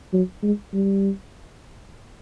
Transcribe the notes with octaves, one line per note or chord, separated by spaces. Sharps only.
F#3
G#3
G3